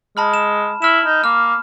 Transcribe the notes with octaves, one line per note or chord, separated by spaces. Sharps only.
G#3 A5 B5 F6
E7
E4 F6 E7
D#4
A#3 F6